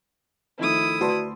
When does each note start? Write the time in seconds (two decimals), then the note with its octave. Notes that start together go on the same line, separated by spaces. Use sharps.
0.59 D#3 F3 A3 E4 D#6
1.01 D2 F#4 B4 D5 A5 C6